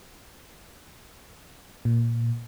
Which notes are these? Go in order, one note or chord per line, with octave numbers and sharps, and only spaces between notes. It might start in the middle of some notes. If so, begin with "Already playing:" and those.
A#2